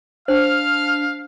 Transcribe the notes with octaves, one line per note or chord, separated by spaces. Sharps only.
D4 C5 F5 F6